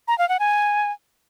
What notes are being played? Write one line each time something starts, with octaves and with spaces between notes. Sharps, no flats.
A#5
F5
F#5
G#5